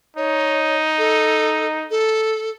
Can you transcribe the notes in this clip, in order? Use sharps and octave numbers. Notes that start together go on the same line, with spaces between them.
D#4 C#5
A4
A4